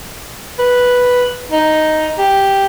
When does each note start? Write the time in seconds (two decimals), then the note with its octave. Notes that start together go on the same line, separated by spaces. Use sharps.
0.59 B4
1.52 D#4
2.18 G4